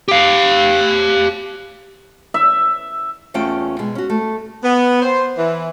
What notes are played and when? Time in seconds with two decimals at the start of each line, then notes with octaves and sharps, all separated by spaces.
0.08 G4 F5
2.34 E5
3.34 E2 A3 C#4 F4 G5
3.79 B2 G#3
3.95 C#4 F#4
4.10 A3
4.64 B3
5.02 C5
5.38 E3